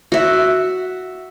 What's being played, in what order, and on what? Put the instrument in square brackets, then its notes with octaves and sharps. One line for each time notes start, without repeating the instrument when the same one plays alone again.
[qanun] F#4 E5